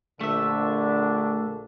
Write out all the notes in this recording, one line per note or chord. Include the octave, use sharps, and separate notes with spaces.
A#1 D3 A3 D4 E5